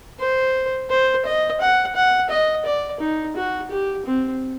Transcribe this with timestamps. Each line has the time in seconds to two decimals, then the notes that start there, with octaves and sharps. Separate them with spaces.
0.19 C5
0.90 C5
1.26 D#5
1.61 F#5
1.95 F#5
2.30 D#5
2.65 D5
3.00 D#4
3.36 F#4
3.71 G4
4.05 C4